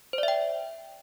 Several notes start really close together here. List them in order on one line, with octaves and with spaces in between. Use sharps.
C5 D5 E5 G5